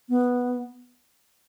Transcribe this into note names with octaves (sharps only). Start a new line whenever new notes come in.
B3